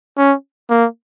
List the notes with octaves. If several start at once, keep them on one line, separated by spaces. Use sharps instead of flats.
C#4
A#3